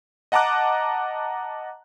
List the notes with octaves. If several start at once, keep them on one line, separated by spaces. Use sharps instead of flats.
D#5 F#5 A5 A#5 D6 F#6